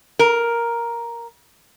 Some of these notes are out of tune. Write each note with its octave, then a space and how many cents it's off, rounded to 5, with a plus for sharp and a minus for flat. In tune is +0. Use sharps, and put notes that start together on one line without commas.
A#4 +5